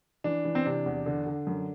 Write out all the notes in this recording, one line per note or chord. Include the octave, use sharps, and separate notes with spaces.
E3 D4
E3
C4
C3 D4
E2
D3
D3
F#2